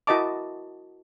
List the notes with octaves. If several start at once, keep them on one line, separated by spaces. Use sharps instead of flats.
E4 F#4 A#4 D#5 A5 D6